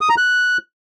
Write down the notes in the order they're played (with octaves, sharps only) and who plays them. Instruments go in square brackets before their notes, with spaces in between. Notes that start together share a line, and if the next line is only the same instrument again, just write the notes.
[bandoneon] D#6
A#5
F#6